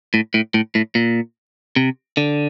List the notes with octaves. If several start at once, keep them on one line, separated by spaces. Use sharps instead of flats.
A2
A2
A2
A2
A#2
C3
D3